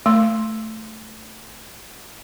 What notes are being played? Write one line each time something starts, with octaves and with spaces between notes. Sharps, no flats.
A3 C6